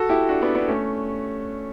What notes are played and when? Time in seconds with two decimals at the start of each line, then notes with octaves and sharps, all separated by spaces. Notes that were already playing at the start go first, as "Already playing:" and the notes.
Already playing: F#4 A4
0.09 E4 G4
0.29 D4 F#4
0.42 B3 D4
0.55 B3 D4
0.68 A3 C#4